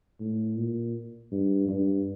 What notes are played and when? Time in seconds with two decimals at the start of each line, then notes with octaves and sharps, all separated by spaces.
0.20 A2
0.57 A#2
1.32 G2
1.68 G2